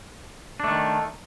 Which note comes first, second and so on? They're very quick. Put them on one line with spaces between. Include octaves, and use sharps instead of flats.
D4 A3 D#3